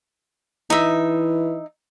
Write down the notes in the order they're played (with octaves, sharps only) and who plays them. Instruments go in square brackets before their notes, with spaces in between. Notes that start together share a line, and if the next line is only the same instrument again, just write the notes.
[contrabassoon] E3 [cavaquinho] D#4 E5